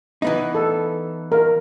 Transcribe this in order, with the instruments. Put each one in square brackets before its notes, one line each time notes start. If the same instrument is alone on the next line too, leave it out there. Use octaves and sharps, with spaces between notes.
[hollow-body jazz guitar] E3 B3 D#4
[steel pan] A4
A#4